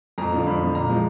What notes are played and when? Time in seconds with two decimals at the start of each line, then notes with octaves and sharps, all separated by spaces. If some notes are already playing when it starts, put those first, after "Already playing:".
0.18 F2 A#5
0.32 D3 F3
0.47 F2 B5
0.61 D3 F3
0.75 A#2 A#5
0.89 F3 G#3